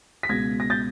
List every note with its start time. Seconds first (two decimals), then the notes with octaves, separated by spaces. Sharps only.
0.23 B6
0.29 C#2 B2 G#6 A#6
0.60 A#6
0.70 G6 A6